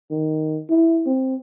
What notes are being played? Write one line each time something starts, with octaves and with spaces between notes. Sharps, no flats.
D#3
E4
C4